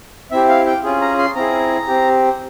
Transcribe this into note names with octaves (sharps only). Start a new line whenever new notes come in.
C4 E4 G4 E5
F5
G5
C#4 F4 G#4
A#5
C6
C4 E4 G#4 A#5
C4 G4